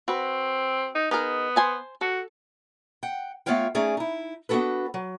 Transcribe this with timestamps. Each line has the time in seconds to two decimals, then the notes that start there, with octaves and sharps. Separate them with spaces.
0.08 C4 F#4 B4
0.95 D#4
1.11 B3 D#4 G#4 A#4
1.56 C5 G#5 A5
2.01 F#4 A4
3.03 F#5 G5
3.46 A3 B3 F4 C#5 F5 G5
3.75 A3 C#4 D#4 G#4 D5
3.97 D#4 E4
4.49 B3 D4 D#4 F#4 A4 B4
4.94 F#3